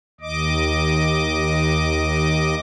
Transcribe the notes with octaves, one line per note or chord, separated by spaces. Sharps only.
D#2 D#5 D6